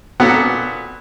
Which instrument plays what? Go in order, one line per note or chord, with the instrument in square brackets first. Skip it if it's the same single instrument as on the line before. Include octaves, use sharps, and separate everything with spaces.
[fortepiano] A#2 B3 F#4 A4 F#5